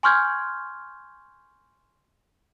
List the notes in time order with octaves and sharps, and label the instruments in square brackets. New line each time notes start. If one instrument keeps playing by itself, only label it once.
[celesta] G#5 C6 C#6 F6 G6 G#6